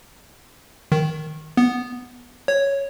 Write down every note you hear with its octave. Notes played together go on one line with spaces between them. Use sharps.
D#3
B3
C#5